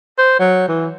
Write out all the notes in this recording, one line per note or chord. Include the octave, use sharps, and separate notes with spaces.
C5
F#3
E3